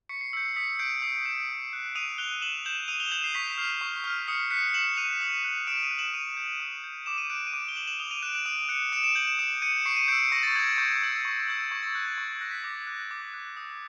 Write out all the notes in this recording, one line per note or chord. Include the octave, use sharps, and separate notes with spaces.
C#6 B6 C#7
C7
E6 G6 B6 C#7
C7
D#6 B6 C#7
G6 C7 D7
D#6 C7 D7
G6 D7 E7
D#6
F#6
D#6 D#7 F7
F#6 F7 G7
D#6 E7 F#7
G6 E7 F#7
D#6 D#7 F7
F7 G7
G6 E7 F#7
C7
C#6 B6
F6 C7
C#6
F6
D#6 B6 C#7
F#6 B6 C#7
D#6 E7 F#7
F#6 D#7 F7
D#6
F#6
D#6 D7 E7
D#7 F7
F#6
E7 F#7
D#6 D#7 F7
G6
D#6
G6
D6 E7
D#7
F#6 D7 E7
D#7
D6 D7 E7
G7
F#6 E7 F#7
E7 F#7
D#6 F7 G7
D#7 F7
F#6 D7 E7
D7 E7
D#6 D7 E7
F#6 C#7 D#7
D#6 D7 E7
D7 E7
G6 E7 F#7
E7 F#7
D#6 D7 E7
G6 C#7 D#7
C#6 C7 D7
C#7 D#7
E6 G6 C7 D7
C7
C#6 A#6
A6
E6 G6 G#6
C#6 G6
E6 G6
C#6
E6 G6
C#6 G#6
A6
F#6
G#6
C#6
F#6 A#6
B6
D6 A#6
F#6
D6
F#6
D#6